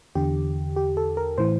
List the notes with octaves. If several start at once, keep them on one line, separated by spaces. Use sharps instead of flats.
E2 D3 G4
G4
A4
A#4
A2 E3 C5